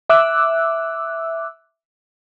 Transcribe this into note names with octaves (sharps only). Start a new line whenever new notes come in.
E5 D6 E6 F#6